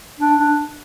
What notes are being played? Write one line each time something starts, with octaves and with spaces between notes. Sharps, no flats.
D4
D4